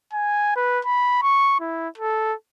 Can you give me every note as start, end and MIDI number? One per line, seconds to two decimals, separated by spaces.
0.13 0.55 80
0.56 0.80 71
0.85 1.18 83
1.22 1.57 85
1.60 1.89 64
1.98 2.34 69